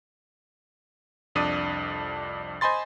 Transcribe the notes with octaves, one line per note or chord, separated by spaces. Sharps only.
C2 F2 D4 D5 D#6 D#7
C5 D#5 G#5 B5 C6 A6